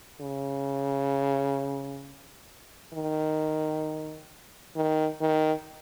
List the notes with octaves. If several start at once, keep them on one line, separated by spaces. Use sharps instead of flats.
C#3
D#3
D#3
D#3